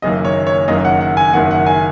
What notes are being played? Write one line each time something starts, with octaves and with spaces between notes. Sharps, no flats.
F#1 F#2 D#3 A#3 D#5
C#5
C#5
F#1 F#2 D#3 A#3 D#5
F#5
F#5
G#5
F#1 F#2 D#3 A#3 F#5
F#5
G#5